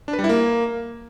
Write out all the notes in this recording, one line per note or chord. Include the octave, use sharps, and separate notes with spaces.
D4
B4
G3
E4
A#3